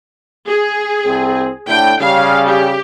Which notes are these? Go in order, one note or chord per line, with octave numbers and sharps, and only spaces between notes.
G#4
C2 C4
A2 D3 G5
C#3 G3 F5
G4